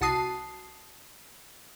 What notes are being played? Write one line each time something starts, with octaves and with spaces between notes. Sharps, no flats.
C2 F#4 A5 D#6 C7